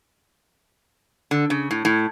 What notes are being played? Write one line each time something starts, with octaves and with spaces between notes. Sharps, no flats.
D3
C#3
A2
A2